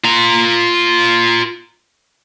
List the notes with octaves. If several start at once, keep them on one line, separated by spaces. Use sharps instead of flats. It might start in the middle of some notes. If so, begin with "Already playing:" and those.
F4 A#5